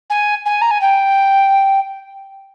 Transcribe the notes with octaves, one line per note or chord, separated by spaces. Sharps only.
G#5
G#5
A#5
G#5
G5